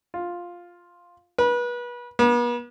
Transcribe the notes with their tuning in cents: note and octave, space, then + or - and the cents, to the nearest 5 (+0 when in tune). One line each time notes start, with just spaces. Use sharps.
F4 +5
B4 -30
B3 -40